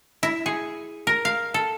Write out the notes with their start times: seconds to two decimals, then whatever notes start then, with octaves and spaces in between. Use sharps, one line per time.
0.23 E4
0.46 G#4
1.07 A#4
1.25 F5
1.54 A4